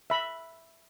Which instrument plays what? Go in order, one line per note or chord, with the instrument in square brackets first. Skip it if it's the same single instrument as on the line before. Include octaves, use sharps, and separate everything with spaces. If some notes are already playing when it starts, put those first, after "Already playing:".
[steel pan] E5 B5